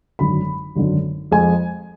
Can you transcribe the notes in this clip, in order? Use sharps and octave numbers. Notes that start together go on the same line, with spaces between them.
G#1 F#2 D3 B5
G#1 F#2 D3
F2 F3 G#3 G#5